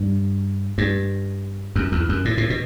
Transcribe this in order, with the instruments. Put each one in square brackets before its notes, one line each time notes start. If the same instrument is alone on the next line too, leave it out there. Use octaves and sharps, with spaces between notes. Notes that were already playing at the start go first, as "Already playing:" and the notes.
Already playing: [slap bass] G2
G2
F#2
E2
F#2
A2
A2
B2